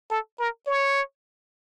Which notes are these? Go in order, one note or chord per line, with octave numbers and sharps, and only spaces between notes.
A4
A#4
C#5